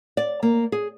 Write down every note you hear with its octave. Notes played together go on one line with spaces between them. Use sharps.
D5
A#3
G#4